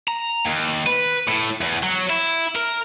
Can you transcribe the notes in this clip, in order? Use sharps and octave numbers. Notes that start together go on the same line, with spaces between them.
A#5
D#2
B4
A2
E2
F#3
E4
A#4